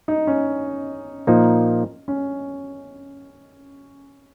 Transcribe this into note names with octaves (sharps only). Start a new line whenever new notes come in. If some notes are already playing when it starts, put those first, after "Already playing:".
D#4
C#4
A#2 F3 A#3 D#4
C#4